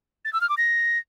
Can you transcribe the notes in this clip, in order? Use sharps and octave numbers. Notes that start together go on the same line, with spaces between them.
A6
E6
F6
D6
A#6